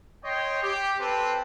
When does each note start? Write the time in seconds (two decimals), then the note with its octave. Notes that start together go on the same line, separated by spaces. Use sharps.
0.25 C#5 D#5 G5 C6
0.63 G4
1.00 C4 G4 A4 B4